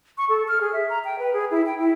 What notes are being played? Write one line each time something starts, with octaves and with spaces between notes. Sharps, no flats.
C#6
A4
F6
G#4
E5
A#5
G5
B4
G#4
E4
G5
E4